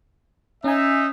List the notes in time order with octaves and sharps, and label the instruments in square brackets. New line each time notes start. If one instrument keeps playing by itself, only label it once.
[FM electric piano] C#4 G#5 [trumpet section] D#4 E5